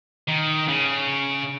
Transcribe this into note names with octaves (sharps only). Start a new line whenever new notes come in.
D#3
C#3